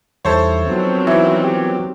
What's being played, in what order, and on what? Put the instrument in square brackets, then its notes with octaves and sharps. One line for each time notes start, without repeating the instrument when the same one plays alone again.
[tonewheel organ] E2 D#3 G3 [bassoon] E4 [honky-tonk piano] A4 C5 C#5
[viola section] D#3 F#3 C4 [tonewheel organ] F3 B3
[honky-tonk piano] E3 [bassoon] E4
[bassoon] G4